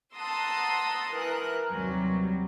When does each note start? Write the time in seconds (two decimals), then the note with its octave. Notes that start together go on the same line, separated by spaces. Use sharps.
0.16 F#5 A5 A#5 C6 D#6 E6
1.13 E3 A#4 F#6
1.69 D#2 C3 F#3 G3